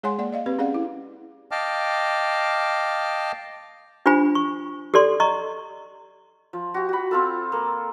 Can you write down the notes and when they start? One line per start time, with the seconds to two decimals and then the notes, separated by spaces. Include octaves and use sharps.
0.03 G#3 G#4 C#5 F#5 G#5 C6
0.18 A#3 D5 F#5
0.33 D5 D#5 F5
0.46 C4 G4 B4
0.59 C#4 G#4 D5 F5 F#5
0.74 E4
1.51 D#5 F5 G5 A5 D6 F6
4.06 D4 F4 G4 C5 G#5 B5
4.35 C#6
4.94 G4 A4 D5 C6
5.20 D#5 A#5 C#6
6.53 F3
6.74 F#4 G4
6.89 F#4 B5
7.11 C4 F4 A4
7.52 A#3 A4